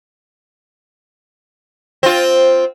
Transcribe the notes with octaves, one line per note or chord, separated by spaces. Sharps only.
C4 F4